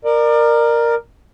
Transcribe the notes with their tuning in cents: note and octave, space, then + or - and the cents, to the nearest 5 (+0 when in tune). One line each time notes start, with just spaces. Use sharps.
A#4 +0 D5 +30